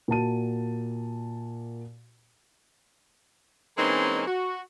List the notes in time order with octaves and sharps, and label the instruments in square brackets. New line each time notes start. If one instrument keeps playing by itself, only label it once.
[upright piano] A#2 F#4 A5 D#7
[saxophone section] E3 G#3 A#3 C4 C#4 D#4
F#4